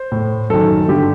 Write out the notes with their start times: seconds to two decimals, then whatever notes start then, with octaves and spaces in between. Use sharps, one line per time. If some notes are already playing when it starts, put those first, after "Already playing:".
Already playing: C5
0.12 A2
0.50 F#2 D#3 A4
0.88 G2 D3 G4